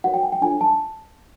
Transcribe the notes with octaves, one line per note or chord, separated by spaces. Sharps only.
F#4 A#4 C#5 F#5
G5
G#5
G5
D4 F4 A4 C#5 G#5
A5